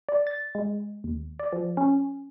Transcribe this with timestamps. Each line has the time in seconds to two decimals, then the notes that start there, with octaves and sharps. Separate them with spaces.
0.09 D5
0.27 A6
0.55 G#3
1.04 D#2
1.39 D5
1.53 F3
1.77 C#4